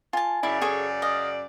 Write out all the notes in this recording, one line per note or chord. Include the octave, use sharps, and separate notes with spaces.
F4 G#5 A5
F#2 C#3 E4 D5 E5
G#4 A4 C#5
D#5 F5